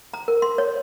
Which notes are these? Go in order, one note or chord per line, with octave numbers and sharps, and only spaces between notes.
A#5
A#4
C6
C#5